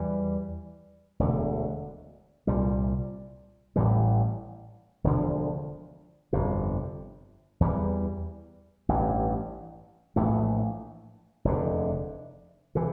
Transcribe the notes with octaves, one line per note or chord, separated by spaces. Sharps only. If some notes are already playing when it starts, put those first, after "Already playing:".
Already playing: E2 E3 G3
E1 D2 D3
C2 A#2 G3
A1 A2 E3 G3
E1 D2 D3 F3
G1 F2 C3
E2 E3 G3
A1 G2 E3
A#1 A2 E3 A3
F1 E2 D3
C3 E3